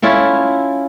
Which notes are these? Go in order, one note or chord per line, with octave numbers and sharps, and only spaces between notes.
C#4 E4 F4 A4